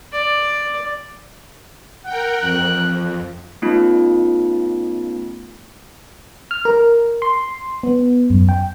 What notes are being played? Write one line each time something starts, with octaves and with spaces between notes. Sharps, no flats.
D5
A#4 F#5 G5
F2 F#6
A3 B3 C#4 D#4 F4
F6
A#4
C6
B3
F#2
G5